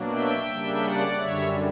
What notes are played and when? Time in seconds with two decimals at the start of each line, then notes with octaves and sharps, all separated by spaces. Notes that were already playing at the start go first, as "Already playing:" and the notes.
Already playing: B2 F#3 A#3 D4
0.12 E5 G5
0.47 C#3 G3 A#3 D4
0.82 D5 F#5
1.18 F#2 D3 G3 C#5 E5